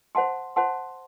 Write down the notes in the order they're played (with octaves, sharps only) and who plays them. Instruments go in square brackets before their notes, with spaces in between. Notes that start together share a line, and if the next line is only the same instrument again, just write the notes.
[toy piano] C5 F#5 A5 C6
C5 F#5 A5 C6